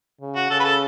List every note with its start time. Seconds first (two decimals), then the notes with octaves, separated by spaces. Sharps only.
0.21 C#3
0.36 F#4
0.50 C#3 A4
0.60 B4
0.65 A4